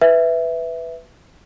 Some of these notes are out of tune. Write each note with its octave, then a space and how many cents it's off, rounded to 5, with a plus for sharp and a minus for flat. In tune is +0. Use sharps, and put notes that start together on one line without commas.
B4 +10 E5 +0